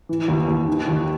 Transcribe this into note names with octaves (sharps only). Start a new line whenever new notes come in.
E3
D#2
D#2
D#3
D#2